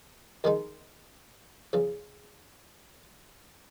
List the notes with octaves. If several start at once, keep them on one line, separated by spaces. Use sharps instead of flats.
D#2 D#3 G#3 D#4
E2 C#3 E3